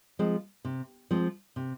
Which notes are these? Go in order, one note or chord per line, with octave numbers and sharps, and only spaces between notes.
F3 G#3 C4
C3
F3 G#3 C4
C3